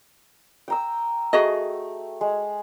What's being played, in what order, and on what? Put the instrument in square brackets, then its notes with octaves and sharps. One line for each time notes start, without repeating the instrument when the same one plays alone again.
[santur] G5 A#5 E6
[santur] A3 [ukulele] F#4 G#4 D#5
[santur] G#3